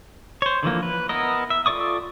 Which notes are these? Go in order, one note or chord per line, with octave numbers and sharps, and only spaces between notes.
C5 C#5
D3 E3 F3 A#3
B4
B3 E4 A#4 D#5
E5
F4 A4 D5 C#6 D#6